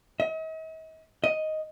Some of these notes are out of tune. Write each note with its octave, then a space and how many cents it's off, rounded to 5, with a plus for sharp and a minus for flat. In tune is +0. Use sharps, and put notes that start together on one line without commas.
D#5 +45
D#5 +5